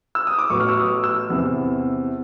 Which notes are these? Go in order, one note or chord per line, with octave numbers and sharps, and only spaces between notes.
E6
D#6
D6
A1 A2 F#3 B3 C#6
F6
E6
D#6
E6
E2 C3 E3